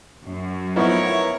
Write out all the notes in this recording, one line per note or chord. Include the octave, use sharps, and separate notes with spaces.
F#2
A2 F3 B3 D#4 E4 A#4 C#5
E4